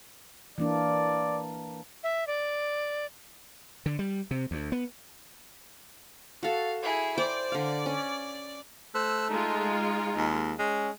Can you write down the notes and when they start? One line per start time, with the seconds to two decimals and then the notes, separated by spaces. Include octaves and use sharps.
0.58 E3 A#3 D4 D5
2.03 E5
2.27 D5
3.86 D3
3.99 G3
4.31 C3
4.51 D2
4.72 B3
6.43 F#4 A4 F5
6.82 E4 G#4
7.18 C5 D5 G5 D6
7.52 D3 F5
7.86 C#4
8.95 A3 C5 E6 F#6
9.29 G#3 D#4 F4
10.17 D#2
10.59 G#3 C#4